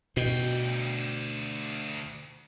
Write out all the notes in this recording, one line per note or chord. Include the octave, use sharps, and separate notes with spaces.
D2 B2 G5